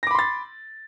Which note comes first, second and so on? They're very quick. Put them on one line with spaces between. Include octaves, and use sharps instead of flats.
A#6 D6 B5 C6 A6